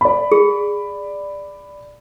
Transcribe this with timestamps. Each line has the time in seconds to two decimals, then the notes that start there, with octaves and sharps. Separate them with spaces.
0.01 D5 B5
0.32 G#4